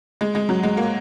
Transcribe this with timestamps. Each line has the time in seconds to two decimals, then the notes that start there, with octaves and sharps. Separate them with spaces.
0.21 G#3
0.35 G#3
0.49 F#3
0.63 G#3
0.77 A#3